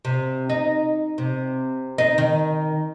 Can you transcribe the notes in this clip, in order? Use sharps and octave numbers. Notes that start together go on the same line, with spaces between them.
C3
D#4
C3
D#4
D#3